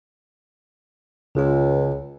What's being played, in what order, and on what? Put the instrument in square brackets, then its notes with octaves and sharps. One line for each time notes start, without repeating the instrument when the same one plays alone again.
[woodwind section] C#2 [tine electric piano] C#3 F4